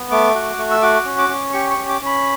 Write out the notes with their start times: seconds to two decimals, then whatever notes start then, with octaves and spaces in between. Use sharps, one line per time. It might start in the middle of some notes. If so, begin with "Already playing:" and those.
Already playing: B3
0.11 A3 D6
0.35 F#4
0.58 A3
0.71 E6
0.82 F#4 D6
1.05 C#4
1.18 D6
1.29 C#4
1.53 G4 C#6
1.70 C#6
1.78 C#4
1.89 D6
2.01 C#4 B5